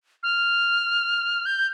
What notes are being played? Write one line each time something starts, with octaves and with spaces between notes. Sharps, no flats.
F6
G6